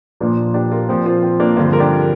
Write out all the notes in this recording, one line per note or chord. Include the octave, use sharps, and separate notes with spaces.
A#2 F3 A#3 D4
D4 G4
F4 A#4
A#2 F3 C4 F4
C4 F4
C4
A#3 D4
G2 D3 F3 C4 F4
A#4
D4 G4